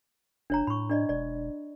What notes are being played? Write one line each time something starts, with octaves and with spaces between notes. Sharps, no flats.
F#1 D4 C#5 A#5
A2 B5 C#6
D4 D5 D#5
E1 D5